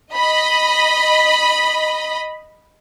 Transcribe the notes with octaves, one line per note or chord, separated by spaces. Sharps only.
D#5 B5